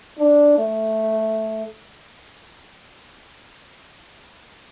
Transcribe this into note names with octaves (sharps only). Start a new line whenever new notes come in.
D4
A3